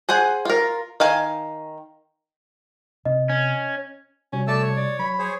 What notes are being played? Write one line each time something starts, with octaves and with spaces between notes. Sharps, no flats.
G#4 C5 F#5 G#5
F4 A#4
D#3 F5 G#5
C3 D#5
C#4
C3 G3 C#4 F#4
A3 D5 A5 E6
C#5
D5
F#3 B5
G#4 C5 C#5